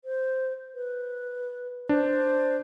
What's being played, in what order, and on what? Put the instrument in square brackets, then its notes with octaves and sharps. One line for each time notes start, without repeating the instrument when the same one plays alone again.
[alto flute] C5
B4
[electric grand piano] D4 [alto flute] C5